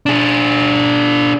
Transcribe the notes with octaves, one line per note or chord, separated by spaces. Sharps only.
D4 G#4